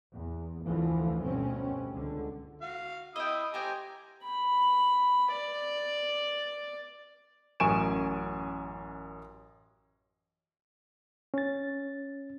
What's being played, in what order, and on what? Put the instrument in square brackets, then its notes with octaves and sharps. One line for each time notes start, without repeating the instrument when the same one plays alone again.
[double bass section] E2
F1 D2 D3 E3 F3
D2 G2 B2 C4 C#4
C#2 D3
[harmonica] F#4 F5
[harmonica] E4 D#6 E6 [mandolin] D#5 G5
[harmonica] G4 G#5 A#5 [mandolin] A#4 C5 G5
[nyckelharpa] B5
D5
[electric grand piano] A1 F#2 G#5 C#6 D7 E7
[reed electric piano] C#4 A6